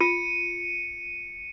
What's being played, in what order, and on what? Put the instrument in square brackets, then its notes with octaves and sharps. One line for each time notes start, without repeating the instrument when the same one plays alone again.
[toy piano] F4 [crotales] C#7 D#7